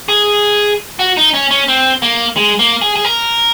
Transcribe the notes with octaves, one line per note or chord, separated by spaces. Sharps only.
G#4
F#4
D#4
C#4
C#4
C4
A#3
G#3
A#3
G#4
G#4
A#4